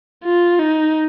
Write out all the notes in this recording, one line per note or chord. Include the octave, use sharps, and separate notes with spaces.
F4
D#4